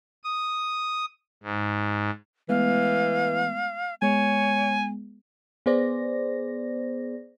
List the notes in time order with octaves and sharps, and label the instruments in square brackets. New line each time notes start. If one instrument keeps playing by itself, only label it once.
[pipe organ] D#6
G#2
[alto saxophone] E3 [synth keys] G#3 A3 B3 [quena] F5
[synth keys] G#3 B3 [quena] C#5 [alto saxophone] G#5
[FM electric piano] B3 G#4 C5 D5 A#6